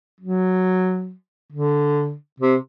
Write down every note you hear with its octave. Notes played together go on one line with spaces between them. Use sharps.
F#3
D3
C3